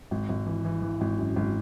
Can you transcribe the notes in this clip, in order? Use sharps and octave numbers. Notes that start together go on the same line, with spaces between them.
G#1
G#1
E3
E3
E3
G#1
F#2
G#1